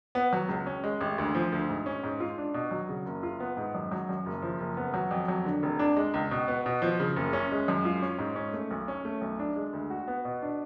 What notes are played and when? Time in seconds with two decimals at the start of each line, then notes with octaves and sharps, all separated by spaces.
0.15 B3
0.33 F#3
0.49 C#2
0.66 C#4
0.84 G#3
1.01 A1
1.18 D2
1.35 F3
1.52 D2
1.69 G#2
1.86 C#4
2.04 G#2
2.20 F4
2.38 D4
2.54 B2
2.71 F#3
2.89 C#3
3.06 F#1
3.23 F4
3.40 B3
3.57 G#2
3.75 F#2
3.92 F#3
4.09 F#2
4.26 F#1
4.42 F3
4.60 F#1
4.77 B3
4.94 F#3
5.11 F2
5.28 F#3
5.45 D3
5.63 F1
5.79 D4
5.97 G#3
6.14 C#2
6.31 B2
6.48 B3
6.66 B2
6.82 F3
7.00 C#3
7.16 F#1
7.33 C#4
7.51 G#3
7.68 F#2
7.85 F4
8.02 C#4
8.19 G#2
8.36 C#4
8.53 A3
8.71 B1
8.88 C#4
9.05 A3
9.21 B1
9.39 D4
9.56 G#3
9.73 D2
9.90 F#4
10.08 B3
10.25 B2
10.42 D4